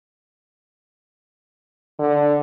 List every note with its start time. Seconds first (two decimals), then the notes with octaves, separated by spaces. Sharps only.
1.99 D3